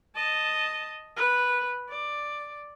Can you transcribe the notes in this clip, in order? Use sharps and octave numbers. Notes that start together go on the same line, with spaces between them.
D#5 A5
B4
D5